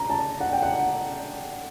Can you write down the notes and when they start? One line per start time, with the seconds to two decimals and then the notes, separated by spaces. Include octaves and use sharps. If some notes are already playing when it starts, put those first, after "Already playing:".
Already playing: A#5
0.10 A5
0.40 F#5
0.52 G5
0.62 F#5